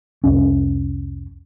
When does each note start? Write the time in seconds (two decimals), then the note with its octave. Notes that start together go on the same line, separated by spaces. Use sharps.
0.24 C2 F2 C#4